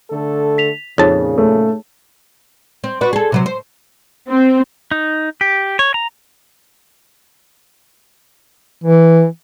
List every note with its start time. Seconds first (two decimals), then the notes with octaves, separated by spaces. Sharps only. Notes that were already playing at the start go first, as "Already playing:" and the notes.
0.10 D3 A3 A4
0.58 B6 F7
0.98 F2 A#2 C#3 D#4 G#4 C#5 A5
1.38 A3
2.84 C4
3.01 F#4 B4 D5
3.13 G#4 A4
3.32 C3 F#3 C5
3.46 C5
4.29 C4
4.91 D#4
5.41 G4
5.79 C#5
5.94 A#5
8.83 E3